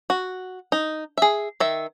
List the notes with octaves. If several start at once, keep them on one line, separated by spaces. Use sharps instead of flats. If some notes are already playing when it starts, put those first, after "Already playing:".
F#4
D#4
G#4 E5
D#3 E5